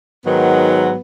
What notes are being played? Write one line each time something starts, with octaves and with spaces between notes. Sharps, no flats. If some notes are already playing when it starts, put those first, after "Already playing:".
G#2 D#3 F#3 B3